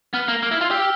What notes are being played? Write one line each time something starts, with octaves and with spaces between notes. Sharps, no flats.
B3 F6
A#3
A#3
E4
F4
G4 E6
F6